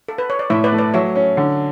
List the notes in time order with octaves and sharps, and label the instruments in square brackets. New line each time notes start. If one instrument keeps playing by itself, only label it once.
[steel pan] A4
B4
C#5
D5
[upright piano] A2 [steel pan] C#5 E5
[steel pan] B4 D5
[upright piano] A3
[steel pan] B4 D5
[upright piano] F#3 [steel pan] C#5 E5
[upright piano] C#4
D3